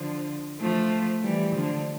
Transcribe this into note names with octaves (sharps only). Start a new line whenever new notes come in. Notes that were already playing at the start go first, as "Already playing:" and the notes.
Already playing: D3 F3
F3 A3
E3 G3
D3 F3